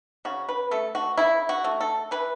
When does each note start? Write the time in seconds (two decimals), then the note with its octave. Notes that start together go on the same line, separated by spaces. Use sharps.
0.25 C#3 F#4
0.49 B4
0.71 A3 A4
0.95 F#4
1.17 C#3 E4
1.49 F#4
1.64 A3
1.80 A4
2.11 E3 B4